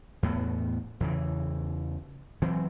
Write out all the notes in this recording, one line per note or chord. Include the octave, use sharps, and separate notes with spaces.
E2 A2 B3
E2 C#3 E3
E3 F#3 C4